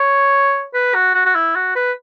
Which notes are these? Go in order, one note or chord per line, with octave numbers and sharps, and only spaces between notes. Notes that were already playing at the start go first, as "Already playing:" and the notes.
Already playing: C#5
B4
F#4
F#4
F#4
E4
F#4
B4